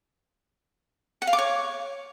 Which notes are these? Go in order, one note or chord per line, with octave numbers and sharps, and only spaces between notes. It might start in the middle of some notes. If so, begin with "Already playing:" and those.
F#5
F5
D6
C#5